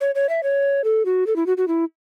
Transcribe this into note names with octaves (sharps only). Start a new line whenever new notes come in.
C#5
C#5
E5
C#5
A4
F#4
A4
E4
F#4
F#4
E4